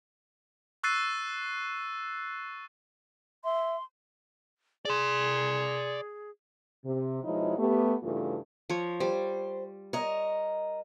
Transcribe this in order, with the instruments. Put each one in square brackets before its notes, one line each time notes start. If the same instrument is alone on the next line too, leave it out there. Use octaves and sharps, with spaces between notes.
[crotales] C#6 E6 F#6 A6 C7 D#7
[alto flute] E5 [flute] C6
[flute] G#4 [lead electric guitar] D5 C6
[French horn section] C3
B2 F3 G#3 D#4 E4 C#5
A3 B3 G4
G2 C#3 E3 A3 F4
[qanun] F3 C#5
[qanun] G3 [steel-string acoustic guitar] C5
[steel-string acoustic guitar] A#4 D#5 [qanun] C#5